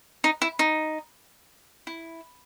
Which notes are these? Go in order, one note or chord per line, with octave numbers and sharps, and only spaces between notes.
D#4
E4
D#4
E4